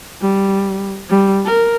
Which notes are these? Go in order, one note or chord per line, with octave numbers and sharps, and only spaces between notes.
G3
G3
A#4